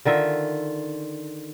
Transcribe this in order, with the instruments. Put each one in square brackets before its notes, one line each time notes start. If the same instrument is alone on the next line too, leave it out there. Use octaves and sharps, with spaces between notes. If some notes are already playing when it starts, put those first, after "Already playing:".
[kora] D3 D#3 F4 E5